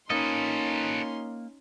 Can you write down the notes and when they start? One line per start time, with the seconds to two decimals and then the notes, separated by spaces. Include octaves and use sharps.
0.10 A#3 C#4 D#4 F4 A4 B4 D#5 C6